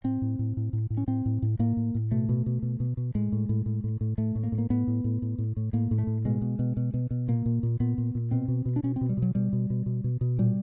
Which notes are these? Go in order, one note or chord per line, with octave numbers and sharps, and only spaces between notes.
A2 C4
A2
A2
A2
A2
A2
C#4
A2 C4
A2
A2
A2 A#3
A2
A2
B2 A3
B2
B2
B2
B2
B2
A2 G#3
A2
A2
A2
A2
A2
A2 A3
A2
A#3
A2
A#3
A2 B3
A2
A2
A2
A2
A2
A2 A#3
A2
A3
A2
B2 G#3
B2
B2
B2
B2
B2
A#2 A#3
A#2
A#2
A#2 B3
A#2
A#2
B2 C4
B2
B2
D4
B2 C#4
C4
B2
G3
B2
F#3
B2 G3
B2
B2
B2
B2
B2
A#2 G3